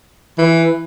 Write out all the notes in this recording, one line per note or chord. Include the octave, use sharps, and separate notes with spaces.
E3